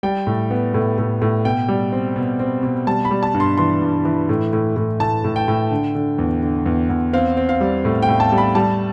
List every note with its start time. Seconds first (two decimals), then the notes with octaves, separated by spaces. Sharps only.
0.03 G3 G5
0.27 A2
0.51 B3
0.74 A2
0.98 A2
1.22 A2
1.45 B2 G5
1.69 G3
1.92 C4
2.16 B2
2.39 C4
2.63 B2
2.87 G3 A5
3.05 B5
3.11 G3
3.23 A5
3.34 G2
3.40 C6
3.58 E3 C6
3.82 G2
4.05 E3
4.29 A2
4.53 A2
4.76 A2
5.00 A2 A5
5.24 A2
5.36 G5
5.48 A2
5.71 D3
5.95 D3
6.18 E2
6.43 D3
6.66 E2
6.90 E2
7.13 C4 F5
7.37 C4
7.49 F5
7.61 G3
7.85 A2
8.02 G5
8.09 A2
8.20 A5
8.32 G3
8.38 B5
8.55 G3 A5